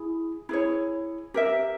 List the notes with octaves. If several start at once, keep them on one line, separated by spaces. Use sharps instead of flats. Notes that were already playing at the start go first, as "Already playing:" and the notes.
Already playing: E4 G#4
E4 G#4 C#5
G4 A#4 E5